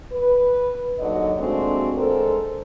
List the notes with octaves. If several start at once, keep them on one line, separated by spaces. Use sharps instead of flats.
B4
D#2 D3 D#3 F#3 D5 D#5
A#2 G#3 A3 C4 D4 F#4
D3 G#3 A4 A#4 C5